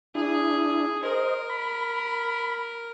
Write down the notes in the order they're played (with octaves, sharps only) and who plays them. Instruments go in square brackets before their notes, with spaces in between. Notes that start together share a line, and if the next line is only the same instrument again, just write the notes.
[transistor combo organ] D4 E4 [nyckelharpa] G#4
[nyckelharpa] A#4 [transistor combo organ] C5 D#5
[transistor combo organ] B5